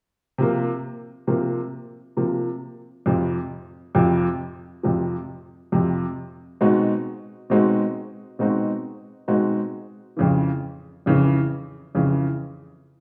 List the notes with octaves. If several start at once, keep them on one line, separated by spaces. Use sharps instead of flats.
C3 F3 A#3
C3 F3 A#3
C3 F3 A#3
F2 C3 F3
F2 C3 F3
F2 C3 F3
F2 C3 F3
B2 G#3 C4 D#4 F#4
B2 G#3 C4 D#4 F#4
B2 G#3 C4 D#4 F#4
B2 G#3 C4 D#4 F#4
F2 C#3 E3
F2 C#3 E3
F2 C#3 E3